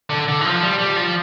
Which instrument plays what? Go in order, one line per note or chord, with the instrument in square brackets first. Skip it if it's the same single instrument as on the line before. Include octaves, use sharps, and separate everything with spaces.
[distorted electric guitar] D3
D3
E3
F3
G3
G3
F3